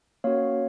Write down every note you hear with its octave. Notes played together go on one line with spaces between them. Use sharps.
A#3 C#4 F#4 C#5 F5